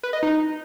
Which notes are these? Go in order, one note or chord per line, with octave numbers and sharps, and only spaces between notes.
B4
D#5
D#4